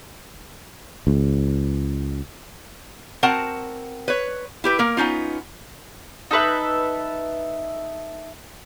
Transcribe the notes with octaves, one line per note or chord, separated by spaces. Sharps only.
C#2
C4 F#4 A#4 F#5 A5
B4 C#5
E4 G4 B4
A#3 A#4
B3 C#4 D#4 F4
D#4 A4 B4 E5